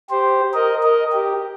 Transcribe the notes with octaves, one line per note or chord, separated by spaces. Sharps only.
G4 C5
A#4 D#5
A#4 D#5
G4